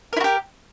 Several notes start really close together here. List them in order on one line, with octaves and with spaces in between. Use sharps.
A#4 E4 F#4 G4